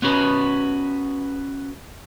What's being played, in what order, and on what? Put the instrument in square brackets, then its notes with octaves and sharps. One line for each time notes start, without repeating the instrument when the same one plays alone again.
[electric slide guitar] B3 C#4 F#4 B4